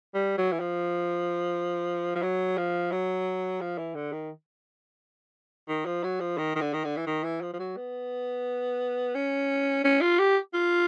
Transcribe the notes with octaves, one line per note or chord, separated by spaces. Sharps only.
G3
F#3
E3
F3
F3
F#3
F3
F#3
F3
E3
D3
D#3
D#3
F3
F#3
F3
D#3
D#3
D3
D#3
D3
E3
D#3
E3
F3
F3
F#3
B3
C#4
C#4
F4
G4
F4